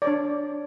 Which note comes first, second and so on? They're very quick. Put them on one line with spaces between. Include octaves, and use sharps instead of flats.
D5 C#5 D4